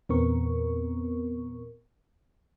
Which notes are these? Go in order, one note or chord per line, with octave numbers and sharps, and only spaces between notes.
E2 A#2 B3 C4 A#4 C#6